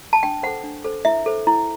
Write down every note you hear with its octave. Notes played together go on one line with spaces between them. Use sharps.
A5
D4 G5
A4 C5 F#5
D4
A4 C5
E4 E5
A4 C5
E4